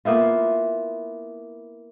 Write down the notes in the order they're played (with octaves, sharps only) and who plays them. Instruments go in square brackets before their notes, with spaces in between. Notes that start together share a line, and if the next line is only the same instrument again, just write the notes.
[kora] A#3 B3 E4 F4